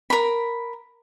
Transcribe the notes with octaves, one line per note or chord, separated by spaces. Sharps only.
A#4 B5